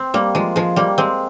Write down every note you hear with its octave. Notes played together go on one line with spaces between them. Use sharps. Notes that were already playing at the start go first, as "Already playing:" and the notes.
Already playing: C4
G3 A#3
F3 G#3
F3 G#3
G3 A#3
G#3 C4